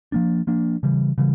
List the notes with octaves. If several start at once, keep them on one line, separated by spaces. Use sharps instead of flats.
F3 A#3 D4
F3 A#3 D4
C#3 E3 G3
C#3 E3 G3